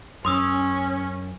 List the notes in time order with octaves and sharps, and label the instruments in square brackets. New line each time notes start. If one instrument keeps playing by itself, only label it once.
[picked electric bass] F#2 [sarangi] C#4 [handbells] C6 D#6 E6